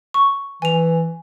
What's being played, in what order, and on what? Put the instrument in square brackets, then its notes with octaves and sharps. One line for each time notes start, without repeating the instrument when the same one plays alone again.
[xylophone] C#6
[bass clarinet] E3 [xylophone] G#5 F7